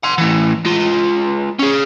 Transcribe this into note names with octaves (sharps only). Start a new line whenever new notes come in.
F#5 C6
A2 E3
G#3 F4
C#4 G#4